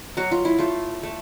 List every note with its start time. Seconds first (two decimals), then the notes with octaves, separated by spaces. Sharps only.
0.17 F#3 F#4
0.31 F4
0.45 E4
0.58 A3 F4
1.03 A3